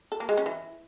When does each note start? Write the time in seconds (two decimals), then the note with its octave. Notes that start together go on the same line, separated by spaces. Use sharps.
0.12 A4
0.20 A#3
0.29 G#3
0.37 C#4
0.46 E3